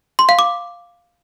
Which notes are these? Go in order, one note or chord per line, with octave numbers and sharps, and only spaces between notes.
C6
F5
D6